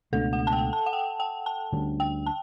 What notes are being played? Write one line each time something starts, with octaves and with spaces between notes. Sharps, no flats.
C#2 B2 A3 D4 A4
F#5
A5
G5
A5
F#5
G5
G5
A5
D2 D3 G3 C#4
G5
A5